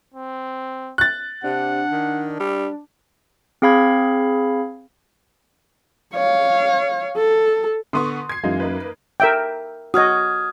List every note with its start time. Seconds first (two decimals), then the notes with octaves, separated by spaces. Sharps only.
0.14 C4
0.98 F#6 A6
1.44 C3 D4 F#5
1.91 D#3
2.40 G3
3.62 C4 G#4 F5 B5 G#6
6.14 C#5 F5
7.17 A4
7.93 D3 B3 C6 C#6 D#6
8.29 G#6 C7
8.43 F#2 E3 G#3 D#4 F#4 F5
8.60 A#3 D#4 B4
9.20 A#4 E5 G5
9.94 F#4 D#5 D#6 F6 G#6